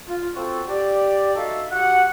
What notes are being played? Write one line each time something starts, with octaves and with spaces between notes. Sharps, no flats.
F4
C4 F4 F#4 A4
G4 D5
D#4 F#4 A4 E5 F5
F#4 G4 F#5